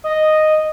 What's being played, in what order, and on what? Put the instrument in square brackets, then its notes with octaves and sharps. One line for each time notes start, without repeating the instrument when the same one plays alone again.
[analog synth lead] D#5